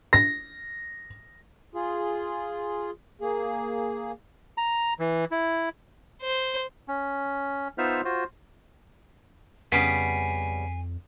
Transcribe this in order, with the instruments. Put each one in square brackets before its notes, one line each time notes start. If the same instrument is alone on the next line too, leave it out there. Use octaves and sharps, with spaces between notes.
[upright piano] A#6
[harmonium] F4 G#4
A#3 G#4
[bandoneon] A#5
E3
E4
[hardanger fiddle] C5
[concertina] C#4
B3 D#4 F4 C5 E5 F6
F4 F#4 C5
[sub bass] F2 [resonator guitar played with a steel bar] C#3 G3 B3 [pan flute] G#5 [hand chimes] B6 C7 D7